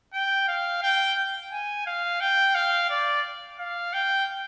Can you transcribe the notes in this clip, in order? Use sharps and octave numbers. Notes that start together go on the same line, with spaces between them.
G5
F5
G5
G#5
F5
G5
F5
D5
F5
G5